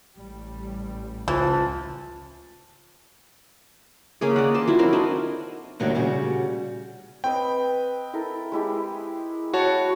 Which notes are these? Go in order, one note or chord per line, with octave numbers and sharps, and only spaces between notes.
A1 G3
C#2 E3 F3
C#3 A#3 C#4 G#4
D5 D#5 F#5
C5 A5
F#3 E4 F4
C4 F#4 A#4 C5
D4 D#4 A4 D#5
D#2 A2 D3 D#3 G3 F#4
A#2 C#3 G3 F#4
C4 B4 D#5 G5
E4 A4 A#4
G#3 E4 G4
F#4 C#5 A5